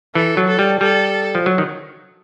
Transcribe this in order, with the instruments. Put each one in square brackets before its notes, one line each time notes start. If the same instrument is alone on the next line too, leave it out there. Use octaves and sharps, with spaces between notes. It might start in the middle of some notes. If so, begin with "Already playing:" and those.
[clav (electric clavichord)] E3 [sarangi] A4
[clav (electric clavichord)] F#3
[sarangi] A4
[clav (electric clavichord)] G3
[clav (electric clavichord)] G3 [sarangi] A4
[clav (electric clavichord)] F3
F#3
D#3